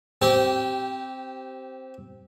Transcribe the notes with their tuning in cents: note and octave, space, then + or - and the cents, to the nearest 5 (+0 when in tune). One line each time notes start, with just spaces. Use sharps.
C4 +0 G4 -20